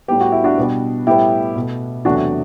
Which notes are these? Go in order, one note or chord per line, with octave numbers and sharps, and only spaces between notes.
A2 G3 B3 G4
F#4
E4
D4 F#4
B2 G3 B3
A2 G3 B3 E4 G4
B2 A3
E2 C3 F#3 A3 D4 F#4